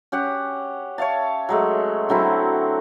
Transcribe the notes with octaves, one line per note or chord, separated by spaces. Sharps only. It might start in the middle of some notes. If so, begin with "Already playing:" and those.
C#4 G4 F#5
C#5 E5 F5 A5
F#3 G#3 A3
D3 F#3 C4 E4